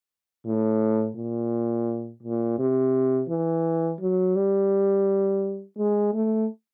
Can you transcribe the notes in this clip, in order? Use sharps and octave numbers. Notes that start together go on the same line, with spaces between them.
A2
A#2
A#2
C3
E3
F#3
G3
G#3
A3